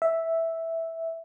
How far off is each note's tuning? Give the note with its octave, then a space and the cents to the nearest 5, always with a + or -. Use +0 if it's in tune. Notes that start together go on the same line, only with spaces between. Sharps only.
E5 -5